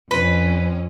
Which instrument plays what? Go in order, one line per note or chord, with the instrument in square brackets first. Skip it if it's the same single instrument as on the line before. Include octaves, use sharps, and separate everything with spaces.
[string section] F2 C#4 [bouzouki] B4